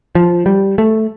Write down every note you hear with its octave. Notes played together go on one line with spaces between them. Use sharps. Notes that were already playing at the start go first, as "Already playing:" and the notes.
F3
G3
A3